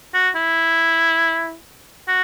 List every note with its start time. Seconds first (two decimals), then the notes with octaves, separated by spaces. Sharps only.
0.14 F#4
0.35 E4
2.08 F#4